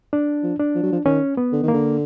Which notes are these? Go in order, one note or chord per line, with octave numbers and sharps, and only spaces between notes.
D4
F3
D4
F3
F#3
F3
D#3 C#4
B3
D3
D#3
A#3
D3